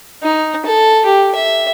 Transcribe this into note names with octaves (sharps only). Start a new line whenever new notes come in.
D#4
A4
G4
E5